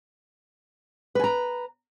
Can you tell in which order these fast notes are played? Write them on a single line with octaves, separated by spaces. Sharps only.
B4 G#5 A#5